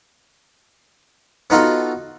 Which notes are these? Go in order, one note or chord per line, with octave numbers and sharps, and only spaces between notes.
B3 D#4 F4 F#4 A4